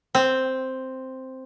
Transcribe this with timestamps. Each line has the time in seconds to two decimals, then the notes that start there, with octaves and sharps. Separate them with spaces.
0.15 C4